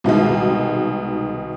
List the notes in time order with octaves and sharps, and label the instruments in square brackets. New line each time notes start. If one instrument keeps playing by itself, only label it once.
[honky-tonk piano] C2 B2 D#3 G#3